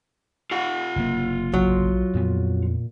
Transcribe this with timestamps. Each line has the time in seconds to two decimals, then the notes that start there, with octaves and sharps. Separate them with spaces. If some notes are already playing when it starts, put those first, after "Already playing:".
0.51 F4 F#5
0.96 F#1 C3 A#3
1.54 A#1 F#3
2.14 F2 A#2 B3